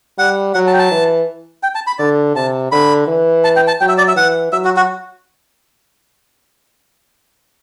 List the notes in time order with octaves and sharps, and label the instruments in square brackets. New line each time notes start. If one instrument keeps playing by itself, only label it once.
[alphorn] G3 [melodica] F#5
[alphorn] F#3 [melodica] F#5
[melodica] A5
G5
A5
[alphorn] E3
[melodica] G5
A5
B5
[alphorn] D3 [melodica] D5
[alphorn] C3 [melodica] A5
[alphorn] D3 [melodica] B5
[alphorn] E3
[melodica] A5
G5
A5
[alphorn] F#3 [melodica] G5
[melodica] E5
D5
E5
[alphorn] E3 [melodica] F#5
[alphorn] F#3 [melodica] E5
[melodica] F#4
F#4